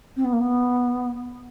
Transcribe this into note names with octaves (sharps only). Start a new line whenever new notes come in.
C4
B3
A#3
B3